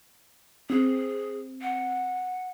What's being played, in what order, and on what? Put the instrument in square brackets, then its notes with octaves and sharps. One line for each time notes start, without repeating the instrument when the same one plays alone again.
[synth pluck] C4 [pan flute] G#4
[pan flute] F#5